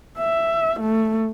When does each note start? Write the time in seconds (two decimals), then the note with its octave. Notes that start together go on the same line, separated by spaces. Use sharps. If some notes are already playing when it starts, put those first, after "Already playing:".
0.18 E5
0.80 A3